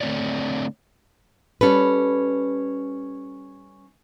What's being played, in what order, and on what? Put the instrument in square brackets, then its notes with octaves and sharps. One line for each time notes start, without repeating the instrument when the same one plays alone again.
[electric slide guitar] D3 A3 C4 D4 C#5 D5
[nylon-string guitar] G3 C#4 A4 B4